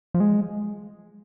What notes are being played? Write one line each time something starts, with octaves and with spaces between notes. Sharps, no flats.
F3
G#3